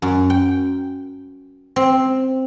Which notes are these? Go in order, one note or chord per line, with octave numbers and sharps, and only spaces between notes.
F#2
G5
C4